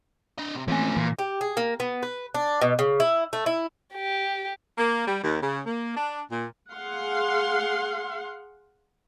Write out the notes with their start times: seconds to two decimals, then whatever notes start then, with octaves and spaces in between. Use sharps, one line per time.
0.38 D4 D#5
0.55 C3
0.68 E3 F3 A3 A#3 C4 C#4 G#5
0.96 A#2 E3
1.19 G4
1.41 G#4
1.57 A#3
1.80 B3
2.03 B4
2.34 D4
2.61 B2
2.79 C#3
3.00 E4
3.33 A3
3.46 E4
3.95 G4
4.78 A#3
5.07 G3
5.23 D#2
5.41 C#3
5.66 A#3
5.96 D4
6.31 A#2
6.72 G#4 F5 F#5 C6